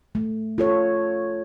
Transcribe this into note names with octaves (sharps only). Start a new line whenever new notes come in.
A3
F4 A4 C#5